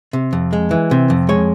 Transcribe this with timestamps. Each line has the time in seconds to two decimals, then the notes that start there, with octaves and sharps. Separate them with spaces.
0.13 C3
0.33 F2
0.53 G#3
0.71 E3
0.91 C3
1.10 F2
1.29 G#3 C#5